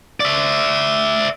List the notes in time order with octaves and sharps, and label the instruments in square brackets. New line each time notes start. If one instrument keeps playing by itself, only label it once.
[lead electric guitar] D5 E5